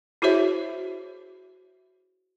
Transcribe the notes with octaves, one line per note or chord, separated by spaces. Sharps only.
E4 F#4 G#4 C5 C#5 E5